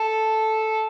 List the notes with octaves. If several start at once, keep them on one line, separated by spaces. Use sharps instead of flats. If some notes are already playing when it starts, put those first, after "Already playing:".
Already playing: A4